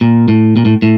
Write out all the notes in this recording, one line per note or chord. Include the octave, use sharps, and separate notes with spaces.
A#2
A2
A#2
A2
A2